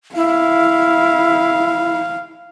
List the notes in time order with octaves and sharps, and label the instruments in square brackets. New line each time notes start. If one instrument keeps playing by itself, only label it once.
[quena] E4 [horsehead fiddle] F5